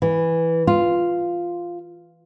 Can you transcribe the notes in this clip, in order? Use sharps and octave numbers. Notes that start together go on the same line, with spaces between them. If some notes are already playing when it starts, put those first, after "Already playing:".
E3
F4